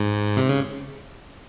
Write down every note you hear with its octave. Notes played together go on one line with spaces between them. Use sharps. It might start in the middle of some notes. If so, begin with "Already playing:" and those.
Already playing: G#2
C3
C#3